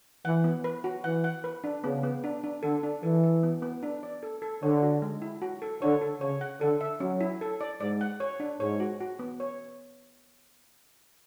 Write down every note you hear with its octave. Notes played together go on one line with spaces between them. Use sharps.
E3 F#5
B3
B4
F#4
E3 F#5
F#5
B4
D4
C#3 B3
B3
D4
D4
D3 A4
D4
E3 A4
E5
B3
B3
D4
D5
A4
A4
D3 C#5
F#4
G#3
E4
F#4
A4
D3 C#5
A4
C#3 C#5
F#5
D3 A4
E5
F#3 C#4
E4
A4
D5
G#2 D5
F#5
C#5
D4
G#2 C#5
F#4
F#4
B3
C#5